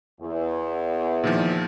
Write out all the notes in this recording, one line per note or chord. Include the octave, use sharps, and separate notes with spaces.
E2
A#2 D#3 F3